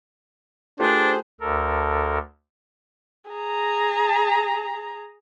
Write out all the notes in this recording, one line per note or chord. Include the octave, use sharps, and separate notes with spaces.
A3 D4 F4 G4 G#4 B4 C5
D2 A4 A#4
G#4 A#5